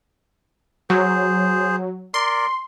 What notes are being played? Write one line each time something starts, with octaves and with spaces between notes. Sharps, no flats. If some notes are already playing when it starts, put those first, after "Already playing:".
F#3 G#4 C5
A#4 D5 C6